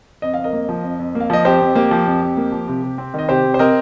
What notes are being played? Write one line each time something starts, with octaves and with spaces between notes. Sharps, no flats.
F2 D#5
F2 F5
A#4 D#5
A#3
F3
F2
F2
A#3
F5
F3 D#5
F2 G4 C5
F2
A#3 G4
F3
F2
F2
A#3
F3
C3
C3
C4
D#3 D#5
C3 G4 C5
C3
C5
C4 A#4 D#5